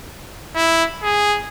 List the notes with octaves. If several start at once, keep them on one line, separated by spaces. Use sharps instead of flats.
E4
G#4